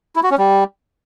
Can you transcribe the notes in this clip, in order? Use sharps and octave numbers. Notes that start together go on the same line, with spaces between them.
E4
F#4
C#4
G3